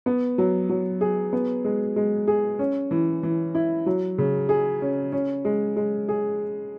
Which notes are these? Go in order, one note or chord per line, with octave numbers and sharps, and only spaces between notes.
B3
F#3
F#3
G#4
B3
G#3
G#3
G#4
C#4
E3
E3
E4
F#3
C#3
G#4
C#4
C#4
G#3
G#3
G#4